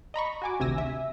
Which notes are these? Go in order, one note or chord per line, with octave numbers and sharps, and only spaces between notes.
D#5 A#5 B5 C#6
F#4 G#5 D6
G#1 D2 C3 G#5 E6 A#6
E5